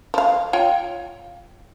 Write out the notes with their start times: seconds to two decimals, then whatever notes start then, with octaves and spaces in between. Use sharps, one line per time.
0.14 F3 F5
0.53 F4 C#5 G5